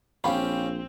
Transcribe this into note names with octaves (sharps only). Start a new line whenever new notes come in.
A#1 C4 C#4 G4 F5 B5